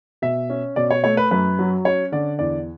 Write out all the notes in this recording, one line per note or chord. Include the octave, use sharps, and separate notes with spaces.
B2 E5
C#4
B2 D5
C#5
A3 C#5
B4
F#2 B4
F#3
C#4 C#5
D3 D5
E2 D5